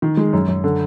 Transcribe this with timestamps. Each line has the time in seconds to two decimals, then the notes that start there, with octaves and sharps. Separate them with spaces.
0.02 D#3
0.17 G#3
0.33 F#2
0.48 F#2
0.64 D3